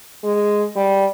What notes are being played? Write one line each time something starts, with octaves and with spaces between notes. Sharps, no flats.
G#3
G3